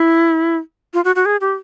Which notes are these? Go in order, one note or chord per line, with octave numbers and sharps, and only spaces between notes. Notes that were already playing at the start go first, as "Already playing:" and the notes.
Already playing: E4
F4
F#4
F#4
G#4
G4